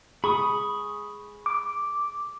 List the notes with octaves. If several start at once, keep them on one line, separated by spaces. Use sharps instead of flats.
G#4 B5 C#6 D#6
D6